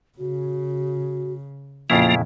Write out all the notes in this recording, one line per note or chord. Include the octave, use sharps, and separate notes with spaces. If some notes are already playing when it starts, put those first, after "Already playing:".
C#3 F#4
F2 A#2 C#3 F3 A#3 E4 F4